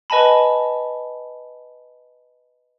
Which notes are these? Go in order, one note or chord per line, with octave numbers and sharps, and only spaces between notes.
B4 D#5 G#5 A5 B5